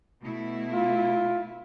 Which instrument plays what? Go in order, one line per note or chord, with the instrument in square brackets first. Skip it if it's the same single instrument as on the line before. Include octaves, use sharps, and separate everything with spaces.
[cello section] B2 A3 E4
[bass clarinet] F4